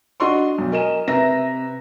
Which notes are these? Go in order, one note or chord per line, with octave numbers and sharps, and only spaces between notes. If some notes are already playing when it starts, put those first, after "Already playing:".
D4 F#4 D#5 C6 C#6
B1
A#4 D#5 G#5 E7
C3 B4 E5 A#5 A#6